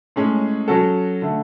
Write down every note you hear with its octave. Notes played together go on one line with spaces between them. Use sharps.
A2 G#3 C#4 G#4
F#3 C#4 F#4 A4
D3 A3